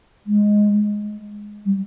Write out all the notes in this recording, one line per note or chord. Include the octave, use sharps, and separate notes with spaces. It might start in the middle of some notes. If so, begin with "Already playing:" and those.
G#3
G3